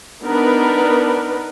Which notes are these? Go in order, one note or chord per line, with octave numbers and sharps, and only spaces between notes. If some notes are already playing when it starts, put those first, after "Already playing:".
B3 D4 D#4 A#4 B4